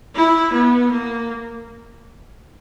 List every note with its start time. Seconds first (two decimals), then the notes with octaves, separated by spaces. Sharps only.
0.16 E4
0.53 B3
0.91 A#3